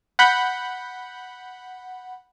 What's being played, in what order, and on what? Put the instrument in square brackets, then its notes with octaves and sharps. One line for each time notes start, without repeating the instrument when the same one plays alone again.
[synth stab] F#5 B5 G6